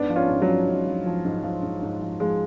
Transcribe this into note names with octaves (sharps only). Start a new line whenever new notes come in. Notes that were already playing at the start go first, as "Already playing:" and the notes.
Already playing: G#2 B3 D4
F3
C#4 F4
G#2
F#3
F3
G#2
F3
F3
G#2
F3
G#2
G#2
F3
F3 G#3